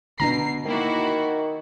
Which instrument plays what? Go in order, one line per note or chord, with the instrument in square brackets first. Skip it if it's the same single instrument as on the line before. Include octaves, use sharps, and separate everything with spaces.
[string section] B2 C7 [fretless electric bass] D3 C#4 D4 [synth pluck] A#5
[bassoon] D#3 [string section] A#3 E4 F#4